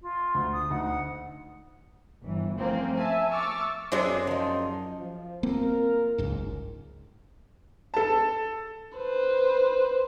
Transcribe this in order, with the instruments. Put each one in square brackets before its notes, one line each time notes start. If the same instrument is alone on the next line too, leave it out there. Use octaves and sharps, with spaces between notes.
[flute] F4
[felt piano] D2
[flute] D#6
[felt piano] D2 D#4 [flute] F#5
[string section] G1 E3
F3 A3 A#3 C4 C#4
E5 G#5 A5
C#6 D6 E6 F6 A6
[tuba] F#2 [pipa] C3 F#3 G#3 [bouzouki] G#4 C5 D5
[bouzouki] F3 D#4
[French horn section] F3
[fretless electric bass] A#3 C4 [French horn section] F4 A#4
[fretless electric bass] F#1 C#2 G#2
[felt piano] A4 A5
[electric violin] B4 C5